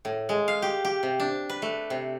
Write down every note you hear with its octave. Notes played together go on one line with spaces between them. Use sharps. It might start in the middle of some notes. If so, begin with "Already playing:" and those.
A2
G#3
F5
G4
G4
C3
D4
B4
A3
C3